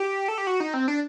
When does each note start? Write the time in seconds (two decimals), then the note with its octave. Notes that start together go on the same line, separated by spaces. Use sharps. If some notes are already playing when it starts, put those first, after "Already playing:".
Already playing: G4
0.28 A4
0.38 G4
0.47 F#4
0.60 D#4
0.74 C4
0.88 D4